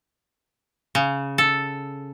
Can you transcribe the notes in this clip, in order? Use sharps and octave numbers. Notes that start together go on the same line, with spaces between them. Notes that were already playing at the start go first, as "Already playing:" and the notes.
C#3
A4